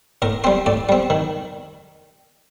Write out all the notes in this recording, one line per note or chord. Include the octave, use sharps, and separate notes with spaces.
A2 A#4
G3 C4 C5
A2 D5
G3 C4
D#3